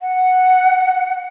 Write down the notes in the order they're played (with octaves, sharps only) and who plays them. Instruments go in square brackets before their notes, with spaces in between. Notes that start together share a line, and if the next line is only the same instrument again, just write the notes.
[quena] F#5